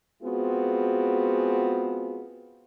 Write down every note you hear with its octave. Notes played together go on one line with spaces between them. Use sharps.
G#3 B3 C4 F4 F#4 G#4